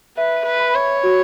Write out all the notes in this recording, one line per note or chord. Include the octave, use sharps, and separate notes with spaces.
B4 E5
B4
B5
C#5
F#4